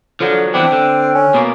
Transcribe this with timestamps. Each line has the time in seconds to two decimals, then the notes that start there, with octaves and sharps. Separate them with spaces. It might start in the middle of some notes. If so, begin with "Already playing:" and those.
0.20 D3 F3 F#3
0.54 E3 B3 C4 D4
0.72 D3
1.15 C#4
1.34 B2 A#3